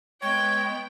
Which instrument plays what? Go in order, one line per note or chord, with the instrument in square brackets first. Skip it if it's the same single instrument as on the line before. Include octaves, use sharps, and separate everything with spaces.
[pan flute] G#3 [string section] B3 G5 [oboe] C#5